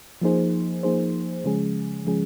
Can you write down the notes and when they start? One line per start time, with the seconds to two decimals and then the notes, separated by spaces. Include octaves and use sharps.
0.21 F3 A#3 D#4 G#4 C5
0.83 F3 A#3 D#4 G#4 C5
1.44 C#3 F3 G#3 C#4 G#4
2.05 C#3 F3 G#3 C#4 G#4